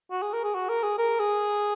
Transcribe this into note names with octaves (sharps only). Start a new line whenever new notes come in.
F#4
G#4
A#4
G#4
F#4
A#4
G#4
A#4
G#4